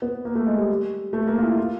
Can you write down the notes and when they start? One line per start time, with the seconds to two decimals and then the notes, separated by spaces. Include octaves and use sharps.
0.02 B3
0.25 A#3
0.35 A3
0.46 G#3
0.58 G3
1.13 A3
1.27 A#3
1.38 F4
1.42 E4
1.57 F4